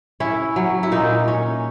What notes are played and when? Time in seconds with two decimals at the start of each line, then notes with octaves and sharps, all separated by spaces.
0.20 C#4 E4
0.56 F#3
0.83 E4
0.92 A#2 D#4
1.28 C#4